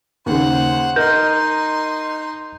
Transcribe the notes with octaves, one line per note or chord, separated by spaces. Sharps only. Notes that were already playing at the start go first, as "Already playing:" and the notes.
D#2 C#3 C5 F#5
D#4 A#4 D#5 C6 G6